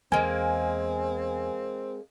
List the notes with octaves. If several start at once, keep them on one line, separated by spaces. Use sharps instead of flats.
E2 G#3 A#3 C4 G#5